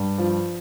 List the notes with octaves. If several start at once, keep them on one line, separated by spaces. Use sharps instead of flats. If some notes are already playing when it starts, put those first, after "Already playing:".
Already playing: G2
F3